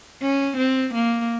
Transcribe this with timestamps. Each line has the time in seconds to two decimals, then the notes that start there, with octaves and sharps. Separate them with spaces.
0.22 C#4
0.57 C4
0.94 A#3